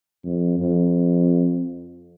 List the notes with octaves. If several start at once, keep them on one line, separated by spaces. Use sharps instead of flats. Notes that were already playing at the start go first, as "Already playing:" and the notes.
F2
F2